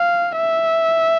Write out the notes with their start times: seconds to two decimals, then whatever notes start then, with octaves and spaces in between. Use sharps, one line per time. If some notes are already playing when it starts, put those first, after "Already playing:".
Already playing: F5
0.37 E5